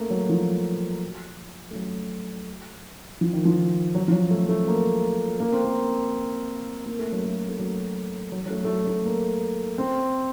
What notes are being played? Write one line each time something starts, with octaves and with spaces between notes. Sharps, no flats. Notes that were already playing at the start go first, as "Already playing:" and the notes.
Already playing: A3 A#3
F#3
F3
A3
F#3
F3
D#3
F3
F#3
F3
F#3
A3
A3
A#3
A#3
C4
A#3
A#3
A3
F#3
A3
A3
F#3
F#3
F#3
A3
A3
F#3
A3
A#3
C4